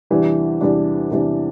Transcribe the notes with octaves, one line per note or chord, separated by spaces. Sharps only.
E2 C3 E3 G3 D4
E2 C3 E3 G3 D4
E2 C3 E3 G3 D4